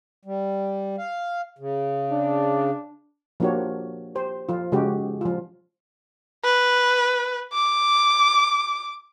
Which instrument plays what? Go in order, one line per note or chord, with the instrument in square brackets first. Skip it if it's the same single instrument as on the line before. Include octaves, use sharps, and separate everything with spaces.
[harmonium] G3
F5
C#3
[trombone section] D4
[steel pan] F3 A#3 D4 F#4 G4 C#5
G4 C5
F3 F4
C#3 G#3 F#4 G4
F3 F4
[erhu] B4
D6